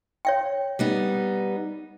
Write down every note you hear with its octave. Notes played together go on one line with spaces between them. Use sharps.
C#5 F5 G5
G3 B3 D#4